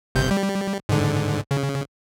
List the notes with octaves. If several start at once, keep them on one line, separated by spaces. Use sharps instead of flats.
G1 C3 G6
G3
G#2 D3
C#3